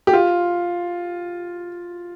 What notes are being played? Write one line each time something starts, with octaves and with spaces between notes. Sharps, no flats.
G4
F4